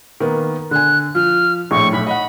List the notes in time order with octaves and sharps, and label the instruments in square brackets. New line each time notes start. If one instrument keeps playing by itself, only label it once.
[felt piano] D#3 A#3 B3
[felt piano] D3 G#5 [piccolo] F#6
[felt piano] F3 [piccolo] F6
[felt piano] A#1 A2 [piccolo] C#6
[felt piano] B1 A2 [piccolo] B5
[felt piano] D#5 F#5 [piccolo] B5